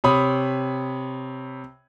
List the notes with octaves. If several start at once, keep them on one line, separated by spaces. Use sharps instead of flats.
C3 C#5 B5 D#6